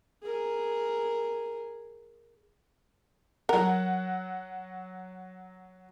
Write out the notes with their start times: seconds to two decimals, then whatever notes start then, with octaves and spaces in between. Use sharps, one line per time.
0.23 G#4 A#4
3.49 F#3 A#4 F#5